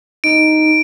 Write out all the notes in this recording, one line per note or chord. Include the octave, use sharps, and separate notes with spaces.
D#4 D7